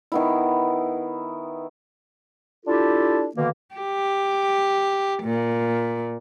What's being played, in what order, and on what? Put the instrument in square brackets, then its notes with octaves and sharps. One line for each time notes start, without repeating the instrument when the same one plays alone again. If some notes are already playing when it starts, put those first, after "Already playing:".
[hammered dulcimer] D#3 B3 E4
[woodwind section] D4 E4 F4 G4 A4
B2 D3 D#3 A#3
[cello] G4
A#2